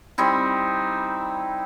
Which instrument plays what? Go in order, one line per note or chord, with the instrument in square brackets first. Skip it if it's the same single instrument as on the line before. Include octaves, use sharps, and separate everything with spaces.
[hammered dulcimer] G3 C4 D#4 E4